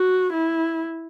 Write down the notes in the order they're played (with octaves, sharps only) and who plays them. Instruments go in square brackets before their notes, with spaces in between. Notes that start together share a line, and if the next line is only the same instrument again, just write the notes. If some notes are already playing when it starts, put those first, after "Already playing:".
Already playing: [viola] F#4
E4